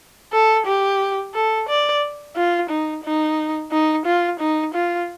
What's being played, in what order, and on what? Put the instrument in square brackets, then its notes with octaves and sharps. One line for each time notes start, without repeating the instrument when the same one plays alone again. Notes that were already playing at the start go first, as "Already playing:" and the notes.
[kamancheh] A4
G4
A4
D5
F4
D#4
D#4
D#4
F4
D#4
F4